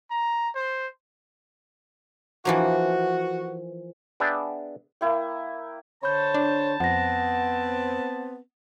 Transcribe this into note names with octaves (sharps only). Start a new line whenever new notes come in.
A#5
C5
E3 F3 A#3 F#4
B3 D4 G#4 D5 E5 G5
A#3 E4 G5
D3 C5 C#5 A5 B5 G6
D4
F2 B3 C4 F#5 A#6